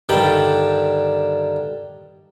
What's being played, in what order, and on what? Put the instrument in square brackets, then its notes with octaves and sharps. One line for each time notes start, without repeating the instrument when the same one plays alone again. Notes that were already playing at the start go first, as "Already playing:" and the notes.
[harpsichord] G2 D3 D#3 G5 A5 B5